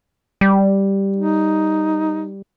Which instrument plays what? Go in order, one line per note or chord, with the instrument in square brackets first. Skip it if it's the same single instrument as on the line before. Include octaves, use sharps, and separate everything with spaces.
[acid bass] G3
[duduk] D#4